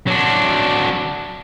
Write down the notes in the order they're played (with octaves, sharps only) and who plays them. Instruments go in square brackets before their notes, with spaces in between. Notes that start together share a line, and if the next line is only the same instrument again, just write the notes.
[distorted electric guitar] F#3 D4